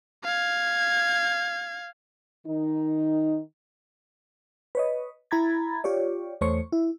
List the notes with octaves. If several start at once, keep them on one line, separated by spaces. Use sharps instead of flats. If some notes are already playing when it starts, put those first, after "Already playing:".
F5 G#6
D#3 D#4
B4 C#5 D#5
E4 A#5 B5 G#6 A6
F4 G4 C#5 D5
E2 A3 C5 C#5 C#6 C#7
E4